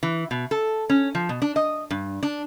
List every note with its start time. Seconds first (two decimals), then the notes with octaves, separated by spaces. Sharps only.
0.03 E3
0.31 B2
0.51 A4
0.90 C#4
1.15 F3
1.29 B2
1.42 D4
1.56 D#5
1.91 G2
2.23 D4